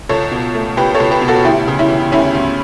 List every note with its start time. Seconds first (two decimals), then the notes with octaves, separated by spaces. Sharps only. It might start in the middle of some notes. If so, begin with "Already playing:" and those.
0.09 C#2 A4 C#5
0.32 B2
0.55 A3
0.77 C#2 G4 B4
0.95 A4 C#5
1.00 C#2
1.11 G4 B4
1.22 B2
1.28 F#4 A4
1.45 D2 E4 G4
1.68 C#3
1.79 C#4 E4
1.90 E3
2.12 D2 C#4 E4
2.35 D2